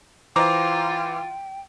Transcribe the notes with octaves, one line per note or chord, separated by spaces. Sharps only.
E3 F4 C5 G5 A#5 D6